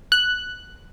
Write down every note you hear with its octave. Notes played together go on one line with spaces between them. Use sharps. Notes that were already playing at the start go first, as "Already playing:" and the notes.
F#6